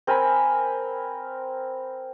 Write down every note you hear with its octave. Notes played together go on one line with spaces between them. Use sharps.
C4 A#4 G#5 B5